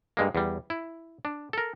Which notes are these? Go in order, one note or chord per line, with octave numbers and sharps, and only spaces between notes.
G2 G#3 A#3
E2 G3
E4
D4
A4 A#4